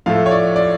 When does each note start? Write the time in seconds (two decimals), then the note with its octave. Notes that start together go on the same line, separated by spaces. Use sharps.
0.06 A2 F3 A3 F5
0.26 C#5
0.31 D5
0.56 D5